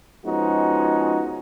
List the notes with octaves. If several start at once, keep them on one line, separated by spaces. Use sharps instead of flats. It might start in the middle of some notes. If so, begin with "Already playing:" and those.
F3 G#3 B3 C#4 D#4 F#4